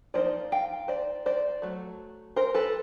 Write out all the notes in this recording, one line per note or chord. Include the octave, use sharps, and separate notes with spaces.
F3 A#3 D#4 C5 D5
F5 G5
C5 D5
C5 D5
F#3 A3
A#4 C5
A4 B4